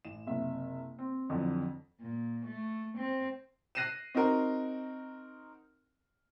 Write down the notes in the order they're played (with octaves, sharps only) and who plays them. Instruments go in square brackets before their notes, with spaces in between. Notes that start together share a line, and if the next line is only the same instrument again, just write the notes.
[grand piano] A1 E7
F#1 C3 E5
C4
F2 D3 E3 F#3
[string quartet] A#2
A3
C4
[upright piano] F#6 A#6 C7 D#7 E7
C4 D#4 F#4 A#4